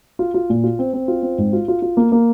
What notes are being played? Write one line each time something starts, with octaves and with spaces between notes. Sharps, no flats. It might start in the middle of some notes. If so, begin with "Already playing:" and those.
F4
F4
A#2
F4
C4
C4
F4
C4
G#2
F4
F4
F4
A#3
A#3